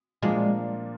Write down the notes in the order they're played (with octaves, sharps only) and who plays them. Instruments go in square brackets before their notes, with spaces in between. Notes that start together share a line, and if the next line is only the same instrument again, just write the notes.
[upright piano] A#2 F3 A#3 D4 F4 [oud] G#3